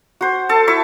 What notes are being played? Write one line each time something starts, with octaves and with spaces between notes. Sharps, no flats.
F#4 C5
A4 A5
E4 E5 C#6